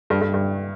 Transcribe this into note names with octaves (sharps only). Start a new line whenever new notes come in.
G2
G2
G2